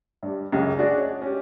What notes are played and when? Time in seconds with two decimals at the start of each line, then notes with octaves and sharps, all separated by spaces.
0.23 G2 G3
0.52 C#2 F#2 C#3
0.78 D4 F#4 G#4 D5
0.97 C#5 D#5
1.22 C#4 G4